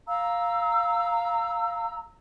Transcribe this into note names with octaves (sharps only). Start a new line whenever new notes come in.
F5 A#5 E6